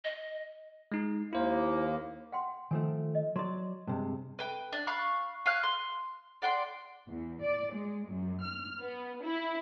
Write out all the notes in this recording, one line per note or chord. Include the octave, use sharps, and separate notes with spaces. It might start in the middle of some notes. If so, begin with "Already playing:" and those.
D#5
G#3 D#4
D#2 A#3 E4 C5
F#5 G5 C6
D#3 F3 A3 G#5
D#5
F#3 D5 C6
G2 C3 G#3
B4 G5
D4
F5 B5 C#6 F#6
F5 G#5 F6 F#6
C6
D5 F#5 G5 C6
E2
D5
G#3
F#2
F6
B3
E4